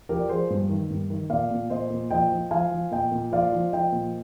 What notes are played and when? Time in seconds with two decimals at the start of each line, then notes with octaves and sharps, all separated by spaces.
0.09 F3 G4 A#4
0.19 D5
0.29 F3 G#4 C5
0.50 G2
0.69 D#3
0.90 G2
1.10 D#3
1.30 A#2 D5 F5
1.51 A#2
1.70 A#2 C5 D#5
1.90 A#2
2.11 F3 D#5 G5
2.32 F3
2.51 F3 F5 G#5
2.71 F3
2.91 A#2 D#5 G5
3.12 A#2
3.32 F3 D5 F5
3.52 F3
3.73 F3 D#5 G5
3.92 A#2